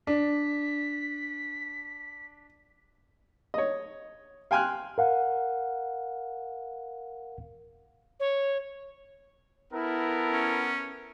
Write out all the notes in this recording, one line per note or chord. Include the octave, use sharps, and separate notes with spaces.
D4 B6
C#5 D#5
F5 G5 G#5 C6 F6 F#6
A#4 F5 F#5
C#5
B3 E4 A4 A#4
C#4